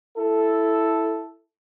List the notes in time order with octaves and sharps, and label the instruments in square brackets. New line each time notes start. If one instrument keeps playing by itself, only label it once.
[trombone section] E4 A4